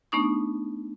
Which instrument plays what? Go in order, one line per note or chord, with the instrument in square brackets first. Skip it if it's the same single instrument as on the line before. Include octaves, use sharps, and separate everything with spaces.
[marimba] A3 B3 D4 D#4 C#6 D#6